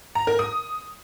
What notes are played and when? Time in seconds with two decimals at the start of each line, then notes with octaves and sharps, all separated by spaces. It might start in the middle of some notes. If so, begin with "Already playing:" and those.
0.15 A#5
0.27 A#4
0.39 D#6